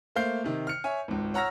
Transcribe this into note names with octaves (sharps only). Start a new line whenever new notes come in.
A3 A#3 C5 F5 G6 C7
C3 D#3
F6 C#7
C#5 E5 G#5
G#1 C#2
C#5 F#5 A#5 E6 F6 A#6